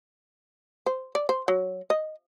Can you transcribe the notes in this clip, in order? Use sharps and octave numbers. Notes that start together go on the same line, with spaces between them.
C5
D5
C5
F#3
D#5